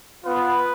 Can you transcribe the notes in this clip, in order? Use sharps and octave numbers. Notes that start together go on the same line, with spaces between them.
B3 F4 B4